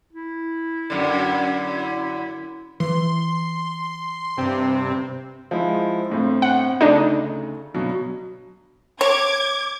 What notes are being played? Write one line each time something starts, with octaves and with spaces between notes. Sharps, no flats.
E4
F#2 D3
E3 C6
G2 C3 C4
F3 G#3 E4
G1 A2 C4
F#5
D2 C#3 A3 D4 D#4
G2 B2 F#3
C#5 D6 G#6